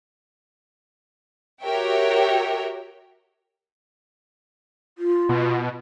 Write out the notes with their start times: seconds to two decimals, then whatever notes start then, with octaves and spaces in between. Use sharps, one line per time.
1.62 F#4 G4 A#4 C#5 E5 G5
4.98 F4
5.29 B2